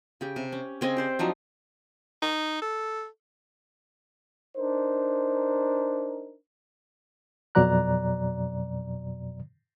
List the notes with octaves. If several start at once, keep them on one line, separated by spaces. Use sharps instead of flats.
C#3 G4
C3
C#4
C#3 C4 D#5 G#5
G4 C5 D5
F3 F#3 D4 D#4
D#4
A4
D4 D#4 A#4 C5
F2 B2 F#3 D5 A#5 F#6